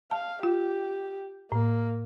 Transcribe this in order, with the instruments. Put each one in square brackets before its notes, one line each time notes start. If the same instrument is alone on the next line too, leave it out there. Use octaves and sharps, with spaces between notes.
[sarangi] F5 [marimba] A5
[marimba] F4 [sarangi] G4
[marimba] A2 [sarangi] A#3